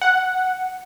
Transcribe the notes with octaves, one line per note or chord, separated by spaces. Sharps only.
F#5